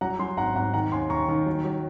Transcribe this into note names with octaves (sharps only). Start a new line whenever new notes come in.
F#3 F#5 A#5
F#3 G#5 C6
G#1 F#5 A#5
G#1 F#5 A#5
D#3 F#5 A#5
D#2 G#5 C6
D#2 A#5 C#6
D#3
F#3
F#3